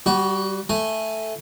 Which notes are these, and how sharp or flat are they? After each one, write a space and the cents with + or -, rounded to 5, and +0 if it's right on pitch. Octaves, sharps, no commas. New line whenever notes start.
G3 -15 F#4 +20
A3 +0 G#5 +0